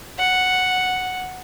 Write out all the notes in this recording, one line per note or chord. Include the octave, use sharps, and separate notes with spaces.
F#5